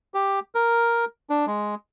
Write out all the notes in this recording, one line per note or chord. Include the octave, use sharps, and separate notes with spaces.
G4
A#4
D4
G#3